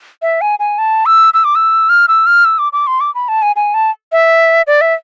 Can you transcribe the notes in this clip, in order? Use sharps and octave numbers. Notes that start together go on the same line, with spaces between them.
E5
G#5
G#5
A5
E6
E6
D6
E6
F6
E6
F6
E6
D6
D6
C6
D6
B5
A5
G#5
G#5
A5
E5
D5
E5